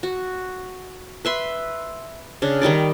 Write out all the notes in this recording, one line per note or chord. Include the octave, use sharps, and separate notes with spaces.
F#4
B4 E5 C6
C#3 D4
D#3 G3 D#4 D5